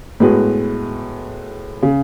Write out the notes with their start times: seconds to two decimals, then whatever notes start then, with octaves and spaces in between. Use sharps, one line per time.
0.20 A2 G#3 B3 F#4 B4
1.82 C#3